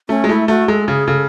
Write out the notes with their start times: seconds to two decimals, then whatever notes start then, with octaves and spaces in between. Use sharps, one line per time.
0.09 A3 C#4
0.24 G#3
0.29 A3 E4
0.48 A3 F#4
0.68 G#3 A4
0.87 C#3 G#4
1.07 C#3 A4